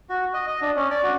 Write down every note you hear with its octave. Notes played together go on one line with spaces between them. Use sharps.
F#4
D#5
D#5
D4
C#4
D5
F#4